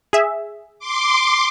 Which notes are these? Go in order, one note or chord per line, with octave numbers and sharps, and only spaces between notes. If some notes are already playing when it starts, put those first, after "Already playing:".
G#4 E5
C6 D6